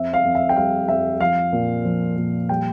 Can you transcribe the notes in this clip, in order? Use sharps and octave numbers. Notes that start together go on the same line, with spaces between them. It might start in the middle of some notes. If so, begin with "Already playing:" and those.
Already playing: F2 E5
F5
F2
E5
G5
G3 F5
F2 E5
F3 F5
A#2
F3
A#2
G3 G5